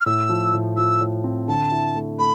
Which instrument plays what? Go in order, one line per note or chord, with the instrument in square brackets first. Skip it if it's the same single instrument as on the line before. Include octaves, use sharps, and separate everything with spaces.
[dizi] F6
[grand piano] A2 [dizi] E6
[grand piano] F3
A2
[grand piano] F3 [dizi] E6
[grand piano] A2
C4
[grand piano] D3 [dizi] A5
[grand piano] E4
A3
[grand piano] A3 [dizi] B5